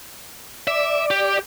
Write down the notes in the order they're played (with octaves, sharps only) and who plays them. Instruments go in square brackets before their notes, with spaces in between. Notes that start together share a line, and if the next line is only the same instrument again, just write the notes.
[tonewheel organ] D5 [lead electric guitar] E5
[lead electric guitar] G4